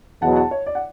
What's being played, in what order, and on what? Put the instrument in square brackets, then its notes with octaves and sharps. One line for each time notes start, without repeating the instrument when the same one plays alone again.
[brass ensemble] E2 B2 F#3 [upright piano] F#5 A5
[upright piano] F#5 A5
C#5
D5
F#5